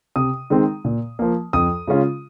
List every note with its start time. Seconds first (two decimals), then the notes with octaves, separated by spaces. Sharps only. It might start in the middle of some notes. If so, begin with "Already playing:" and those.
0.16 C3 D#6
0.50 D#3 G#3 C4
0.85 A#2
1.19 F3 A#3
1.53 F2 D#6
1.88 C#3 G#3 C#4 F4